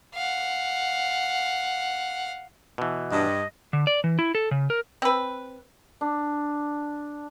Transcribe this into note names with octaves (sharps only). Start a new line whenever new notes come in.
F5 F#5
B2 E3
G2 D#5
D3
D5
E3
E4
A4
C#3
A#4
C4 B4
D4